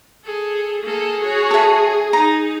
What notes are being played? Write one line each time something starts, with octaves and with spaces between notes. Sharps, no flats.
G#4 A4
A#3 G#4 A4
F#4 C#5
A4 E5
D#4 A#5